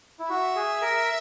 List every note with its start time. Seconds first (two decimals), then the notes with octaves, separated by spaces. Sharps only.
0.19 E4
0.29 F#4 E5
0.56 G#4
0.82 A#4